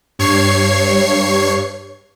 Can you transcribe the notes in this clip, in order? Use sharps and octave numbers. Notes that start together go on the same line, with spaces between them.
G2 C#5 C#6 G#6 C7